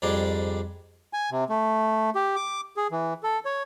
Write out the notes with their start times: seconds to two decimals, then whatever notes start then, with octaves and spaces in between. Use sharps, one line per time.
0.02 F2 G#2 G3 D4
1.13 G#5
1.31 C3
1.50 A3
2.15 G4
2.36 D6
2.77 G#4
2.92 E3
3.23 A4
3.45 C#5